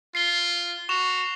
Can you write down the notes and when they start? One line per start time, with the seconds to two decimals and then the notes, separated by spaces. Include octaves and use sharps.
0.15 F4 C7 G7
0.89 F#4 C#6 E7 F7